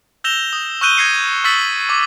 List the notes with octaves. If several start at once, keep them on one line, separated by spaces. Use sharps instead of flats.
E6 G6 A#6 E7 F7 G7
D#6
C#6 E6 F#6 G6 D#7 G7
G6 G#6 A#6 C7 C#7
C#6 E6 A6 B6 F#7 G7
C#6 D6